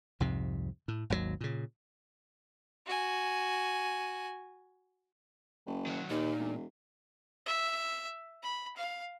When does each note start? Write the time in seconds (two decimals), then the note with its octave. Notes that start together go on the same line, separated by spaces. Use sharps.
0.20 C2 F2 G#2 C3
0.88 A2
1.10 G#1 D#2 B2 F#3
1.41 A#2 C#3
2.87 F#4 G#5
5.66 F#1
5.87 D#3 F#3
6.10 D#2 A#2 D#4
6.39 E1
7.46 E5
8.43 B5
8.77 F5